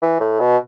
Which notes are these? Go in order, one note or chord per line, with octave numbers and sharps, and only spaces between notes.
E3
A2
B2